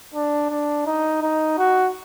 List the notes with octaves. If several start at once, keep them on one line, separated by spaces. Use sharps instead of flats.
D4
D4
D#4
D#4
F#4